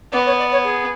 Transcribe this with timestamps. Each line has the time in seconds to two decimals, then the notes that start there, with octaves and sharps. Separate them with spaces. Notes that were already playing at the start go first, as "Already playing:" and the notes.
0.12 B3 D5
0.26 C#5
0.39 D5
0.52 C#5
0.64 G#4